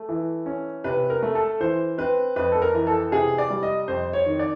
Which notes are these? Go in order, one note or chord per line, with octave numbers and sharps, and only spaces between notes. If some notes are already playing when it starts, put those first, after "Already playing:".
Already playing: A3
E3
C#4
C3 B4
A#4
A3
A4
E3 C5
C4 B4
F2 B4
A4
A#4
E3
A4
C3 G#4
D5
G3
D#5
F2 C5
C#5
D#3
D5